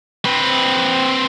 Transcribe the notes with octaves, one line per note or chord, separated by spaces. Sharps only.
C4 B4